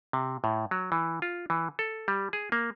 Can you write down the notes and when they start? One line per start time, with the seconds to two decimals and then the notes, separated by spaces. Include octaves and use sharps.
0.13 C3
0.44 A2
0.71 F#3
0.92 E3
1.22 F4
1.50 E3
1.79 A4
2.08 G3
2.33 G#4
2.52 A#3